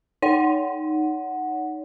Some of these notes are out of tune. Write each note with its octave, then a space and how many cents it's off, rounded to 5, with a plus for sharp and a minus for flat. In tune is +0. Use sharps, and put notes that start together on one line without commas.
D#4 +0 C#5 +40 F#5 +0